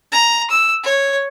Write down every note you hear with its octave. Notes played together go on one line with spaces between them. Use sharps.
A#5
E6
C#5